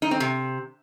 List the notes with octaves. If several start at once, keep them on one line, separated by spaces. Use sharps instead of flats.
D#4
C4
C3